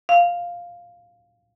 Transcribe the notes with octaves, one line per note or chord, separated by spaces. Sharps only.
F5